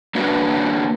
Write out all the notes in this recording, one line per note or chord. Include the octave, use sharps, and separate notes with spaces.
A#3 D4 F#4 B4